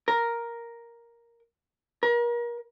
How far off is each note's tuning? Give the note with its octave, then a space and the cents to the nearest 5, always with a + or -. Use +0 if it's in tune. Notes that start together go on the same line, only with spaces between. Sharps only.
A#4 +5
A#4 +35